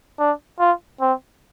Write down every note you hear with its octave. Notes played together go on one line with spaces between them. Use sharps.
D4
F4
C4